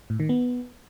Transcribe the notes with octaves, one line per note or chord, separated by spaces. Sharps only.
A2
D#3
B3